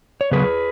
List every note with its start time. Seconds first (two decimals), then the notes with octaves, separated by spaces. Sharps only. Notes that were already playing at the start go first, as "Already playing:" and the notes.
0.21 C#5
0.31 C#3 F#3 B3 G#4 B4